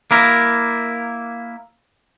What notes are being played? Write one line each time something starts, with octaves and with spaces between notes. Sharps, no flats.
A#3 E4 A#4